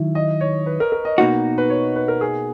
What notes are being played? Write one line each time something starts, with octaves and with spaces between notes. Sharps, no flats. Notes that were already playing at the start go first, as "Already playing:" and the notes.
Already playing: D#3 F#3 E4
D#5
C#5
B4
A#4
A#4
D#5
B2 A#3 D#4 F#4
B4
C#5
B4
A#4
G#4